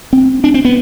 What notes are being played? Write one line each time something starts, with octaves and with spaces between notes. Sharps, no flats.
C4
D4
C4
B3